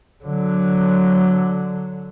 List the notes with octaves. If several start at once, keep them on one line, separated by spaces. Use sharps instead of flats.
D3 F#3